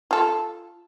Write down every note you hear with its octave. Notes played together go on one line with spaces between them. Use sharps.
F4 A4